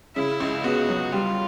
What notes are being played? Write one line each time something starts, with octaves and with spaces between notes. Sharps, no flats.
C#3 E4
C#2
B3 F#4
F#3
G3 F4